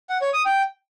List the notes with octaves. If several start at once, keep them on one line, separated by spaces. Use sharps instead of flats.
F#5
C#5
D#6
G5